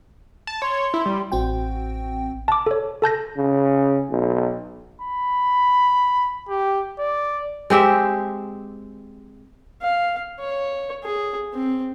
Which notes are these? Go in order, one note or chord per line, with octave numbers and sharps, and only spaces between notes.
A5
C#5 C6
E4
G3
A1 C4 F#4 G5
A5 D6
A4 C#5
A4 A5 G6 A#6
C#3
B1
B5
G4
D5
G#3 C4 G4 E5
F5
C#5
G#4
C4